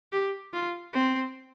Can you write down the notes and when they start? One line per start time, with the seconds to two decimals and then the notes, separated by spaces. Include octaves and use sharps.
0.12 G4
0.53 F4
0.93 C4